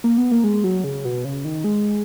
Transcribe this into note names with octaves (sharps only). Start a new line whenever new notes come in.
A#3
B3
A#3
G#3
F#3
C#3
B2
C#3
D#3
G#3